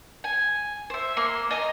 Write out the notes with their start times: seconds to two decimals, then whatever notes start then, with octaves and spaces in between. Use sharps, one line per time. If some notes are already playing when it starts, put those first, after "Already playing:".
0.24 G#5
0.90 C5 E5
1.17 A#3 C6
1.51 D#5 G#5 A#5 D#6